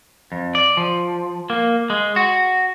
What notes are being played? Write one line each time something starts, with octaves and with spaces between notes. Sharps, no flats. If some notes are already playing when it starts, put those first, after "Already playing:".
F2
D5
F3
A#3
G#3
F#4